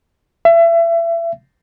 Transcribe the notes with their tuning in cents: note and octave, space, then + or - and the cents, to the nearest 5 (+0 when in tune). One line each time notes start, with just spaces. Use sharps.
E5 +30